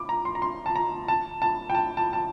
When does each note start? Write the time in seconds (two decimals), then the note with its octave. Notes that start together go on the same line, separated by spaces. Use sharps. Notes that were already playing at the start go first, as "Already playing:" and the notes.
Already playing: D6
0.09 A#5
0.25 C6
0.35 A#5
0.42 C6
0.66 A5
0.75 A#5
1.08 A5
1.42 A5
1.70 G5
1.75 A5
1.97 A5
2.13 A5